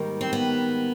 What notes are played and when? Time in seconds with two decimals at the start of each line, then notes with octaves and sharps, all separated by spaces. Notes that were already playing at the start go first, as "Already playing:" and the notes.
Already playing: G#2 D#3 G3 A#3
0.21 C4
0.33 B3